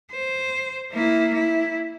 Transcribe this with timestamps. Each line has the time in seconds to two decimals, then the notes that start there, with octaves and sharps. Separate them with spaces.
0.11 C5
0.92 A#3 E4
1.34 E4